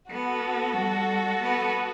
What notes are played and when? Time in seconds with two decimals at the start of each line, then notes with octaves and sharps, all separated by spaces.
0.11 B3 F#4 A4
0.77 G3
1.41 B3